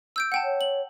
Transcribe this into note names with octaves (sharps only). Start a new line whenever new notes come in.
E6 G6 D7
F#5 G5 A5
C#5
F#7